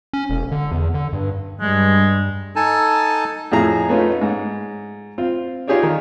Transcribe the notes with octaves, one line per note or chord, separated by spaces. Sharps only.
C#4
E1
D3
E2
D3
G2
G2 G#3
D#4 A4 G#5 A5
F2 A2 G#4 A#5
A3 B3 C#4 D#4 F4
G#2
C4 F4
D#4 F4 G4 G#4 C#5 D5
D#3